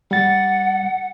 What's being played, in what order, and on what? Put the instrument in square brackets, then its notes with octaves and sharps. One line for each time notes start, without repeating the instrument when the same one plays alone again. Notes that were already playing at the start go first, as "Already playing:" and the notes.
[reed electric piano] G3 A6 [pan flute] F#5